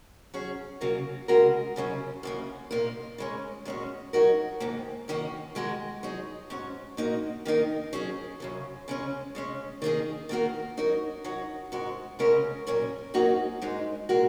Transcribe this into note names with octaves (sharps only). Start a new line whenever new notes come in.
F#3 C#4 G#4
C#3 F#3 A#3 F#4 A#4
C#3 G#3 C#4 F#4 A#4
F#2 C#3 F#3 C#4
F#2 C#3 A#3
A#2 A#3 D#4 A#4
C#3 G#3 C#4
A#2 G#3 C#4 F#4
F#3 D#4 F#4 A#4
G#2 D#3 A#3
F#2 D#3 A#3 F#4
D#3 G#3 F#4 A#4
F#3 D#4 G#4
G#2 F#3 C#4
A#2 A#3 D#4 F#4
D#3 A#3 D#4 A#4
F#3 C#4 G#4
F#2 C#3 F#3
C#3 G#3 C#4
C#3 G#3 C#4
D#3 A#3 D#4 G#4
D#3 A#3 D#4 F#4 A#4
F#3 D#4 F#4 A#4
F#3 D#4 F#4
G#2 G#3 F#4 A#4
C#3 G#3 C#4 F#4 A#4
A#2 F#3 C#4 A#4
G#2 F#3 A#3 D#4 F#4
G#2 G#3 D#4
A#2 G#3 F#4 A#4